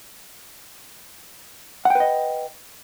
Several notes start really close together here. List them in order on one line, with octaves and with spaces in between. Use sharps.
F#5 G5 B4 D#5